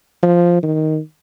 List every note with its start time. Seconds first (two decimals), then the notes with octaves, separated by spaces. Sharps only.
0.23 F3
0.63 D#3